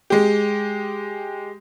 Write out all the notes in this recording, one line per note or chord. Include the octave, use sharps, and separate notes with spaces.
G#3 G4